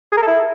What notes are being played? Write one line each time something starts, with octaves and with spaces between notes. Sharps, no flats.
G#4
A#4
A4
E4